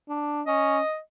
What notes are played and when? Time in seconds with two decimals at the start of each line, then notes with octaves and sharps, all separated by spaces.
0.09 D4
0.46 C#4 D#5